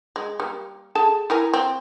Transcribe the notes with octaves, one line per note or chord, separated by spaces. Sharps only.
G#3
G3 A#3
G#4 A4 A5
E4 A#4 G#5
C4